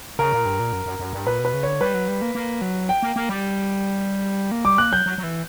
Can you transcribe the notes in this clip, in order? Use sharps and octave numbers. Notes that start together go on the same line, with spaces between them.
C#3 A#4
A#2
G2
A#2
F#2
F#2
F#2
G2
A#2 B4
B2
B4
C#3
D3 C#5
G3 B4
F#3
G3
A#3
A#3
F#3
G5
A#3
A#3
G3
A#3
G3 D6
A#3 F#6
F#3 G6
F#3
F#3
E3